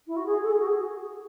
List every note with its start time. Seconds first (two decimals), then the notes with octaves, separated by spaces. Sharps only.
0.06 E4
0.16 F#4
0.25 G#4
0.42 A4
0.50 G#4
0.58 F#4
0.66 G#4